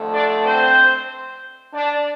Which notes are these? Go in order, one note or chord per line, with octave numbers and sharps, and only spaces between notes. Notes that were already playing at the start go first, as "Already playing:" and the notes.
Already playing: F2 D3 A3
D4 D5
C4 C5
D4 D5